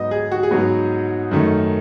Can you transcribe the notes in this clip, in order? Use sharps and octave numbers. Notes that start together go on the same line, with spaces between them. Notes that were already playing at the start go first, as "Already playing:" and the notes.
Already playing: G#2 F#3 B3 D#5
G#4
F#4
G#4
G#2 F#3 B3 F#4
F#2 D#3 A3